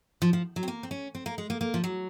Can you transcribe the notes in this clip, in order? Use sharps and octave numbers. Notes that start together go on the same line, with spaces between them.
F3
F3
F#3
C4
A#3
C4
C#4
C4
A#3
G#3
A#3
A#3
F3
F#3